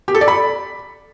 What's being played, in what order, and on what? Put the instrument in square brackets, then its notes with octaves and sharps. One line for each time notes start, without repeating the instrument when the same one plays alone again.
[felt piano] G4
A4
D5
B5